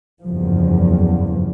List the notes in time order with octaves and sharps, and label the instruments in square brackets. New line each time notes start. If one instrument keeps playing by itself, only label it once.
[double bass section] F#1 E2 G2 F3